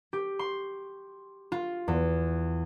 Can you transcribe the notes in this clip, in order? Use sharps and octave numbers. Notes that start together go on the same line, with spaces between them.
G4
C6
F4
E2